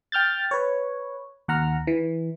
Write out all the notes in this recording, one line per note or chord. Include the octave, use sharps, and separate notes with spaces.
G5 F6 G6 A6
B4 C#5
D#2 F#5 A#5 F6
E3